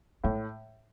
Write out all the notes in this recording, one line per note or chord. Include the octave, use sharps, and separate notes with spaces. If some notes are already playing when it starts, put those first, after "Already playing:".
A2 A3